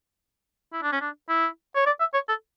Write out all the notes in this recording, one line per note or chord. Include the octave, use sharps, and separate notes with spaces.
E4
D4
C#4
D4
E4
C#5
D5
E5
C#5
A4